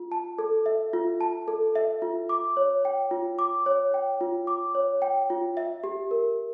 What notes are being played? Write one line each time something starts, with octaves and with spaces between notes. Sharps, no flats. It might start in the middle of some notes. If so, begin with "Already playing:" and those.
Already playing: F4
A5
A4
E5
F4
A5
A4
E5
F4
D6
C#5
G5
F4
D6
C#5
G5
F4
D6
C#5
G5
F4
E5
G4
A#4